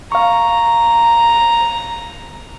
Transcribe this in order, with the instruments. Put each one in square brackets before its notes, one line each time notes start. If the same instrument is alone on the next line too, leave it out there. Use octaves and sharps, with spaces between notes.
[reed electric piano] F5 C#6 [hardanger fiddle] A#5